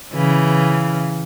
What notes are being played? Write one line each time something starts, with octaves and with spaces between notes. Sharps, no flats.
C#3 E3